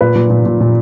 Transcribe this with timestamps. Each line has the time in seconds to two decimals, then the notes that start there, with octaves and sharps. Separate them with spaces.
0.01 A#2 B4
0.15 A#2
0.30 A#2
0.46 A#2
0.61 A#2